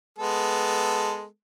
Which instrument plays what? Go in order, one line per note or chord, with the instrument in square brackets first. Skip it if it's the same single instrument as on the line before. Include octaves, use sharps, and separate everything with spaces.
[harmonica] G#3 B3 A4